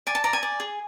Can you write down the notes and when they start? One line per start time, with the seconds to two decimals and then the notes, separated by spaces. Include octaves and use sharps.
0.07 D5 G#5
0.15 A5
0.24 D5 A#5
0.33 G#5
0.43 D5
0.60 G#4